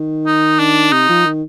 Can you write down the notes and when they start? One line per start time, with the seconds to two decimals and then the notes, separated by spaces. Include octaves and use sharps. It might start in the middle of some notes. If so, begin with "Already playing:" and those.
Already playing: D#3
0.27 D#4
0.60 D4
0.92 C3 D#4
1.09 F3
1.25 D#3